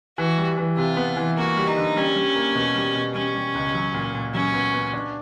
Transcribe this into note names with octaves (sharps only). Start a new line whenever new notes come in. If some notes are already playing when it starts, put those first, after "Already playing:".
E3 F#4
G3
E3
C3 F4
B3
E3
A#3 F#4
G3
D#4
D3
G3 C#4
G3
A#3
B2
G3
B2
G3 C#4
G3
C#2
F#3
A#2
A#2
F#3 C#4
B3
B3
D4